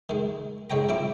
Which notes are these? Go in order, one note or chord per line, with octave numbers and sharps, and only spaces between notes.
D#3 G#3
G#2 G#3 C#5 G5 A#5
F3 C4 E4 D6